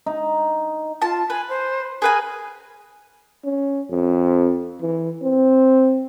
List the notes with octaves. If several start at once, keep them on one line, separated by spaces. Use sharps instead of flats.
D#4
F4 A5
B4 G#5
C5
G#4 A#4 B4 G#5
C#4
F2
E3
C4